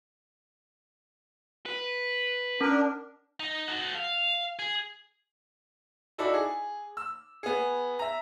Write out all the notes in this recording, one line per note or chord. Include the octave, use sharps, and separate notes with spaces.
B4
C#4 D4 A#4
D#4
F#4 A4
F5
G#4
D#4 E4 F#4 A4 D5
G#4
E6
B3 G#4
E5 A#5